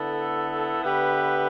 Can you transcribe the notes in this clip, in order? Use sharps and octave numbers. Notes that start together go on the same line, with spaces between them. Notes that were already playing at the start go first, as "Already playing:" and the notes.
Already playing: D3 B3 E4 A4
D3 B3 G4 B4 E5